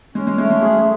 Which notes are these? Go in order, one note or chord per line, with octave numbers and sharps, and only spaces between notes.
G#3 C#4
G#3
G#3 A3
G#3
F#3 G#4